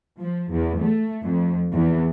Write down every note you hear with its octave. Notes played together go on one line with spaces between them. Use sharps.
F3
E2
A3
F2
E2